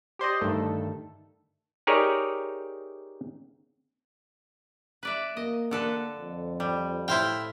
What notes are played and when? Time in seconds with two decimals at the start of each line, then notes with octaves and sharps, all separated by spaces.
0.19 G4 C5 D5 D#5
0.41 D2 G2 D#3 A3 A4
1.87 D#4 G4 G#4 A#4 C#5 D5
5.03 B4 D5 E5
5.37 A#3 D#5
5.71 D3 A4 B4
6.17 F2
6.60 G3
7.08 A2 E4 C5 F5 G5